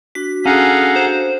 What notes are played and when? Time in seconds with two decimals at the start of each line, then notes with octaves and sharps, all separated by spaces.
0.15 D4 F#4 B6
0.46 C#4 G#4 A4 F5 F#5 A#5
0.96 C5